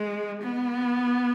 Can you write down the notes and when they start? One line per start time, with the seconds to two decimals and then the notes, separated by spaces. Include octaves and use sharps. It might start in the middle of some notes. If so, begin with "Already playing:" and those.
Already playing: G#3
0.42 B3